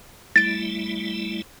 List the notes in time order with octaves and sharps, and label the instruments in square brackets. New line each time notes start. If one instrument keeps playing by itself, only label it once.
[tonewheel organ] G3 A3 E4 [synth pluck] A6 D7